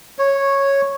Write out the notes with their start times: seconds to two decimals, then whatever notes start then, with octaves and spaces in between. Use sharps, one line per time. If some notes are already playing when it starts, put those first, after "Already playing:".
0.19 C#5